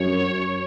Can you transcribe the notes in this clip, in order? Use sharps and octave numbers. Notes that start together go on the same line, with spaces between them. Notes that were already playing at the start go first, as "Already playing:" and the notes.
Already playing: F#2 C#5